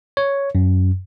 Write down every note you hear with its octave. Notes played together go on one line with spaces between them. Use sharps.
C#5
F#2